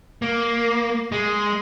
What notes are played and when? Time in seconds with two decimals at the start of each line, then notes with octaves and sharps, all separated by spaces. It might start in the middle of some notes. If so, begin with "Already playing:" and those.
0.22 A#3
1.12 G#3